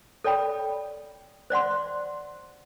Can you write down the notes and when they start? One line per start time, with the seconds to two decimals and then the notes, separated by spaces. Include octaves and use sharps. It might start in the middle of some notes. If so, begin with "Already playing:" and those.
0.24 A4 C#5 D5 G5 B5
1.50 C5 D5 F#5 C6